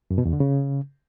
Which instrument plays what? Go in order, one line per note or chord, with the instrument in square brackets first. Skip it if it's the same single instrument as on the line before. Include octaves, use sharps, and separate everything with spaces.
[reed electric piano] F#2
B2
E2
D3
C#3